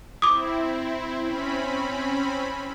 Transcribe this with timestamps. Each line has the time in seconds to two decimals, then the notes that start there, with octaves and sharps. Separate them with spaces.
0.22 C4 E4 D6 D#6
1.23 C4 C#4 B5